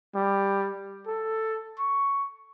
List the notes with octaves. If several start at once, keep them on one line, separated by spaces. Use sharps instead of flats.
G3
A4
C#6